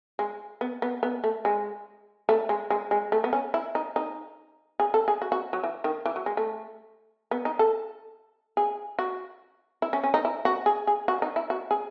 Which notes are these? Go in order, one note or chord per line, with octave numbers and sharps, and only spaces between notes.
G#3
B3
B3
B3
A3
G#3
A3
G#3
G#3
G#3
A3
B3
C#4
E4
D#4
D#4
G#4
A4
G#4
F#4
F#4
F#3
E3
D#3
E3
F#3
G#3
A3
B3
D#4
A4
G#4
F#4
E4
C#4
C#4
D#4
E4
F#4
G#4
G#4
F#4
D#4
E4
F#4
G#4